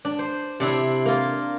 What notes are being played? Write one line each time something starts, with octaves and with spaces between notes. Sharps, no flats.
D4
C5
C3 D4 E4
A#3 F4